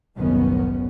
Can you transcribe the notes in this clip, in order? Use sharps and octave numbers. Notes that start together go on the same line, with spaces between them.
F#1 C2 A2 D#3 B3 C#4